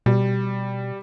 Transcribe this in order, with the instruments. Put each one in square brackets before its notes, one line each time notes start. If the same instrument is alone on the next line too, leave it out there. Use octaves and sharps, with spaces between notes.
[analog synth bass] B2 [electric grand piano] G3